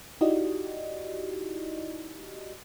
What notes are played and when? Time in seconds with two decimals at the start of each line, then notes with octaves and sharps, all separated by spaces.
0.21 D#4 E4 F#4 G4 D5 D#5